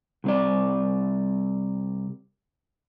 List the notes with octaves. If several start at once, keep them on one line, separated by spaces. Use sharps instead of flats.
C2 C4 D5